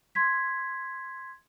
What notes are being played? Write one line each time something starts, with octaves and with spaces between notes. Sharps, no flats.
C6 G#6 B6